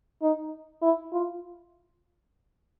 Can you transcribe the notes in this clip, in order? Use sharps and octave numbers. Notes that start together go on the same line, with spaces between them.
D#4
E4
F4